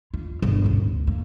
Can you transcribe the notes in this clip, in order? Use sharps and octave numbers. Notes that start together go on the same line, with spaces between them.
F4
G1
A1 D2
A#3